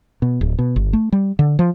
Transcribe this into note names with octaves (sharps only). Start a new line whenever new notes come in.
B2
D1
B2
G1
A3
G3
D3
F3